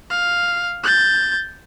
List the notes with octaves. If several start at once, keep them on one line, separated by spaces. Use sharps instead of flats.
F5
G6 A6